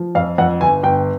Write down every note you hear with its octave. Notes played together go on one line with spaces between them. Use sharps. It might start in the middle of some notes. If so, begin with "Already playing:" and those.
Already playing: F3
F2 F5
F2 F#5
G1 G#5
G1 G5